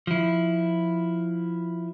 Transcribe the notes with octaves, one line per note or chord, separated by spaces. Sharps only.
F3 E4